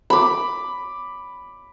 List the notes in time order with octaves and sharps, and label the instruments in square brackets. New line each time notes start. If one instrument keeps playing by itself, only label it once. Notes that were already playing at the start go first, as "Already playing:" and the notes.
[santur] B5 D6